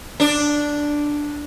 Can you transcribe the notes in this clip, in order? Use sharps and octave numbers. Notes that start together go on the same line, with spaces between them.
D4